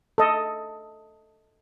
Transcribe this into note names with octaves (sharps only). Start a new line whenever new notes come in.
A4 D#5